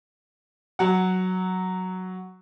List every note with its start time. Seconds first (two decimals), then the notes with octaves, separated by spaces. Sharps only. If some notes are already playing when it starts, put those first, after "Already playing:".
0.79 F#3 F#5